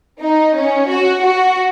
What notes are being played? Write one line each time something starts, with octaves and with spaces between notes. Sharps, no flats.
D#4
C#4
F#4
F#4